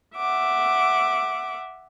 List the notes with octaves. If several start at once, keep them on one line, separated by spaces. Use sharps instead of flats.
E5 F#5 D6